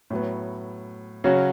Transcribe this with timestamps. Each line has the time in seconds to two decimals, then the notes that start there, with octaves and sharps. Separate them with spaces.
0.10 A2 F#3 B3
1.24 C#3 F#3 C#4 F#4